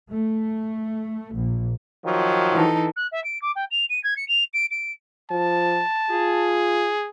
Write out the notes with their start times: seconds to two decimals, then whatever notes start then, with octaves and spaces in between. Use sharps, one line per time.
0.11 A3
1.34 A#1
2.05 D#3 F3 F#3
2.54 E3 D#4 A4
2.96 F#6
3.11 E5
3.24 D7
3.41 D6
3.55 G5
3.70 F7
3.89 D#7
4.03 G#6
4.16 C#7
4.28 F7
4.53 D7
4.70 D7
5.31 F3 A5
6.11 F4 G#4